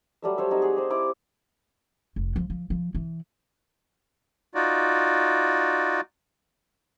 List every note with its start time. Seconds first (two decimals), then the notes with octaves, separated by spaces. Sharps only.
0.22 F#3 G3 A3 E5
0.38 C5 C#5 E5
0.50 F#3 C4 D#4 C#5
0.62 G#4 F#5
0.76 G4 C5
0.90 C4 E4 D6
2.16 F1
2.36 F3
2.50 F3
2.70 F3
2.95 E3
4.55 D#4 F4 F#4 D5